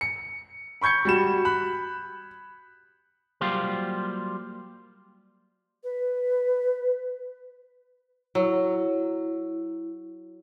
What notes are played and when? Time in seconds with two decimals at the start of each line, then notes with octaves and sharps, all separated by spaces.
0.01 C#7
0.81 B5 C#6 G6 G#6 C#7
1.05 G3 F#4 E7
1.45 B5 F#6
3.41 F#3 G3 A#3 F4 G4 C5
5.84 B4
8.35 F#3 E4